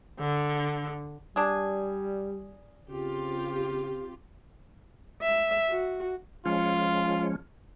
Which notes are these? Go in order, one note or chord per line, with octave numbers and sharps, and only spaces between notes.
D3
G3 D4 G#4
C#3 C4 F4 G4
E5
F#4
F3 G#3 C#4 F4